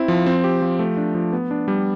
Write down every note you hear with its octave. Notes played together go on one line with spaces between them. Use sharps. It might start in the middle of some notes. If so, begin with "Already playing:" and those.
Already playing: C4 E4
F3
C4
G4
F3
A3
D4
F3
B3
D4
G3